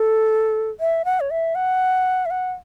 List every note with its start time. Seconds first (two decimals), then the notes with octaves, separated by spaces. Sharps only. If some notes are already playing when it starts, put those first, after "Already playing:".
Already playing: A4
0.80 E5
1.05 F#5
1.20 C#5
1.30 E5
1.55 F#5
2.26 E5
2.31 F#5